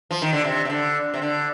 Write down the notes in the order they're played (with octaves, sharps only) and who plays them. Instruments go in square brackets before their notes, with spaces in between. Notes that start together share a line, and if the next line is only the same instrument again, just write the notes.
[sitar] F3
D#3
D3
C3
C3
D3
C3
D3